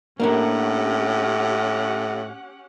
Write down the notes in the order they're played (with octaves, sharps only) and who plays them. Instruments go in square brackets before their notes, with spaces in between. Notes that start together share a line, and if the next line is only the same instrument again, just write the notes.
[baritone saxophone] A2 [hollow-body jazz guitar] A#3 D4 A#4 [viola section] C#4 G4 F#5